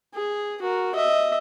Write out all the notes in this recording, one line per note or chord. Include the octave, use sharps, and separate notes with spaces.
G#4
F#4 A#4
D#5 E5